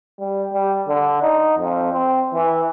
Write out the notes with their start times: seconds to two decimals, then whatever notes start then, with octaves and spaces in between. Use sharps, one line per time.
0.19 G3
0.53 G3
0.88 D3
1.22 D#4
1.59 F2
1.93 C4
2.34 E3